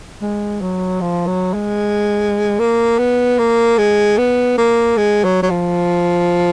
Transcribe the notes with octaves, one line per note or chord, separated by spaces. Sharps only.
G#3
F#3
F3
F#3
G#3
A#3
B3
A#3
G#3
B3
A#3
G#3
F#3
F#3
F3